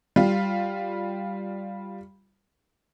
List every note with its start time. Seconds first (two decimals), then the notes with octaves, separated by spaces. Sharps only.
0.16 G3 F4